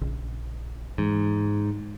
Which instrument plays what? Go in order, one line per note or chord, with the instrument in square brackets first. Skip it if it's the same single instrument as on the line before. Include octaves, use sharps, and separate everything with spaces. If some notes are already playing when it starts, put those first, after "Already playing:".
[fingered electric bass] A#1 C#3
[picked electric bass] G#2 [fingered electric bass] E3